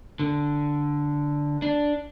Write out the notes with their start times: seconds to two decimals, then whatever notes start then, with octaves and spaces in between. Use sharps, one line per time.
0.19 D3
1.62 D4